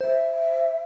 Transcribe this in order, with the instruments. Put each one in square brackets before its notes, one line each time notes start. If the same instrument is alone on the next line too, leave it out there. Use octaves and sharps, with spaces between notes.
[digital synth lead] C5 [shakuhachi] E5